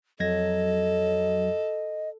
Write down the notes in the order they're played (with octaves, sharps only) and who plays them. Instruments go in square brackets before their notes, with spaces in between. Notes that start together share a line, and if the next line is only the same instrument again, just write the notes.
[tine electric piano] F2 G#6 A#6 [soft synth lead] F#3 [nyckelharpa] A4 [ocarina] D#5